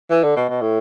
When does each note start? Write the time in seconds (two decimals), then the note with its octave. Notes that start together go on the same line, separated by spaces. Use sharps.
0.11 E3
0.23 D3
0.36 B2
0.49 B2
0.62 A2